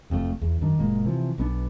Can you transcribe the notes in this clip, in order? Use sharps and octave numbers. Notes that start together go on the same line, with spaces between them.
F1 F2 B2 A3
E2
F#2 D#3 D4
F#1 A#2 G#3 A#3
C3 E3 F3
B1 B3 D4